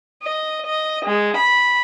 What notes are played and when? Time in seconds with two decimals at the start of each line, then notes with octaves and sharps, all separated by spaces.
0.23 D#5
0.66 D#5
1.06 G#3
1.37 B5